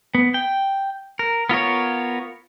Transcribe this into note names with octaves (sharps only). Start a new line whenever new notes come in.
B3
G5
A#4
B3 F4 A#4 C#5